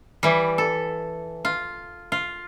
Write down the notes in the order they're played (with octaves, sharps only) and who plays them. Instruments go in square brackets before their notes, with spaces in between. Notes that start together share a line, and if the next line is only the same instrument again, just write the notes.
[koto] E3 G3
A4
F4
F4